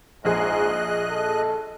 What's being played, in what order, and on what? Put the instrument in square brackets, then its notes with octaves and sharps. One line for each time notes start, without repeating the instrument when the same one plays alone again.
[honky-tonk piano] A#1 G#4 [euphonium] G#2 [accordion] D#5 F#6
[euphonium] A4